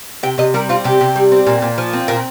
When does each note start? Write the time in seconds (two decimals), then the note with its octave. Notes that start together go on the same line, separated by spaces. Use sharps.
0.23 C3 G5
0.38 C3 D#5
0.54 G3 A#4
0.69 C4 F4
0.84 C3 G4
1.01 C3
1.16 G3
1.32 C4
1.46 A#2
1.62 A#2
1.78 F3
1.93 C4
2.08 A#2 A#4